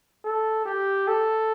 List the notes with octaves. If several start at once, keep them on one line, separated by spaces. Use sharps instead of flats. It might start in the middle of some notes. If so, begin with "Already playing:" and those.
A4
G4
A4